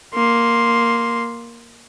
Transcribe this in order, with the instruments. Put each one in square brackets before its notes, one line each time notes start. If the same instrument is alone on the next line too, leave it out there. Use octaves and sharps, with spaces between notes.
[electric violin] A#3 C6